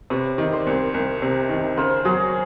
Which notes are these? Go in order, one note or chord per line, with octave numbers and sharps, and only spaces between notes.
C3 B4 C#5
D#3
C5 D5
C2
C2
C3
D#3
C#3 A#4 C5
F#3 F#4 G#4